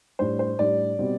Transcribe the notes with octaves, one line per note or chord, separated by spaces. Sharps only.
A2 G3 D4 C5
C5
A2 G3 D4 D5
B2 G3 C4